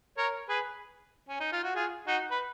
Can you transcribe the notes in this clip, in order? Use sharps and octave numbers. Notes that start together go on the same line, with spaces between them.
A#4 C#5
G#4 B4
C#4
D#4
F4
F#4
F4 G#4
D#4 F#4
B4